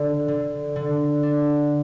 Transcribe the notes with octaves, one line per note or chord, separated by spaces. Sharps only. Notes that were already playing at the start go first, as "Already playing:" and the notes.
Already playing: D3
D3
D3
D4